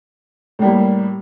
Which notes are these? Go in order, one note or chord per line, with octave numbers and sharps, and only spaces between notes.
A2 G3 A#3